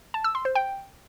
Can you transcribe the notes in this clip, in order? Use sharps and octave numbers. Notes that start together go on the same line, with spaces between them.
A5
E6
C6
C5
G5